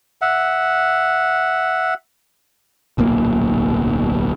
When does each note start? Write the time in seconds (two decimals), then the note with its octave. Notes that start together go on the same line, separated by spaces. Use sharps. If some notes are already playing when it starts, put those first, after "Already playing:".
0.22 E5 F#5
2.98 D1 B1 A#2 A#3